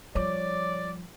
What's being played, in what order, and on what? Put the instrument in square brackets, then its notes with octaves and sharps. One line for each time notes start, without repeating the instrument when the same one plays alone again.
[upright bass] F3 G3 [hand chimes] C#5 D6 [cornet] D5